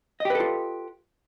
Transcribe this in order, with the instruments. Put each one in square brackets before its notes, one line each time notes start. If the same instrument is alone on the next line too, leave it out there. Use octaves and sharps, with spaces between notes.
[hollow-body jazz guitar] D#5
G4
B4
A4
F4